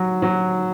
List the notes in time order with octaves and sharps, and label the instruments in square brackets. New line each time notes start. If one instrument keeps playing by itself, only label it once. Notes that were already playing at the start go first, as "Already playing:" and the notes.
Already playing: [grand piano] F#3
F#3